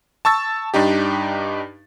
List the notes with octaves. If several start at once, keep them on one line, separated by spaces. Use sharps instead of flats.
A5 C#6 E6 A6
G2 D4 D#4 G4